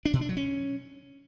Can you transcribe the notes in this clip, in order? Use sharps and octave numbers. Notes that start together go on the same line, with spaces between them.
D4
B2
D4
F#3
C#4